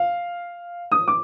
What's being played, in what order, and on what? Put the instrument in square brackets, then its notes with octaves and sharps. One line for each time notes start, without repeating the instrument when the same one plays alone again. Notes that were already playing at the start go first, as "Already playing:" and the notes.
Already playing: [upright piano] F5
D#6
D6